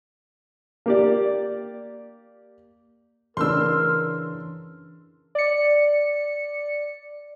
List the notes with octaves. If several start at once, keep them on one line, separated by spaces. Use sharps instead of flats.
A#3 G4 D5
C#3 E3 D4 A#4 C6 E6
D5 C#7